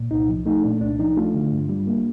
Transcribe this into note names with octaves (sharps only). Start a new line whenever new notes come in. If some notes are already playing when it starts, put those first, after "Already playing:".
Already playing: A#2
C2 D#4
F3
A3 D#4
A#2 D4
C2 D4
F3 D#4
A3 D4 F4
D3
G2
G3
A#3